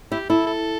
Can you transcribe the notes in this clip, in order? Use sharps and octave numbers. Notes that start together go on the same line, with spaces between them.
E4 G4
E4 A4
A4